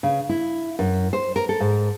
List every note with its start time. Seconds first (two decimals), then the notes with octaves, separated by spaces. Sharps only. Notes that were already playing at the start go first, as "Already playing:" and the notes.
0.03 C#3
0.29 E4
0.79 F#2
1.13 C5
1.36 A#4
1.49 A4
1.60 G#2